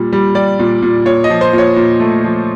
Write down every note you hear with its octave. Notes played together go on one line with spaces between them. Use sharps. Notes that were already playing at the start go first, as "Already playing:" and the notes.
Already playing: A#2 G3
G3
G3 D5
A#2
A#2
A#2 C#5
D#5
F3
C5
A#2
C#5
A#2
A3
F3